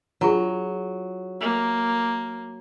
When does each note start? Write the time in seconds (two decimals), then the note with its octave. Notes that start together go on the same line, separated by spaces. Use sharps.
0.21 F#3 D4 F4 G#4
1.40 A#3